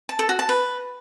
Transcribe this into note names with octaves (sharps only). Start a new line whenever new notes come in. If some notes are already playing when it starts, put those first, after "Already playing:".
A5
A4
F#4
A5
B4